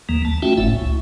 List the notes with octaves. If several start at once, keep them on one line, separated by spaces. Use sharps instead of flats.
D#2 E3 A#3
A5
A3 C#4 F4 F#4 E5 G5
F#1 A2 A3 E4 E5
C#2